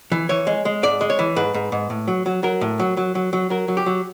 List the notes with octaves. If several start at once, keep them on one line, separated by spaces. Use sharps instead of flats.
E3
E3 C#5
G#3
G#3
G#2 D5
G#3
C#5
E3
G#2 B4
G#2
G#2
A2
F#3
F#3
F#3 A#4
A2
F#3
F#3
F#3
F#3
F#3 A#4
F#3
G4
F#3